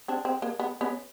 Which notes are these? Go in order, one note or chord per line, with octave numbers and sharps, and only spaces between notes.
C4 D4
C4
A#3
B3
B3 C#4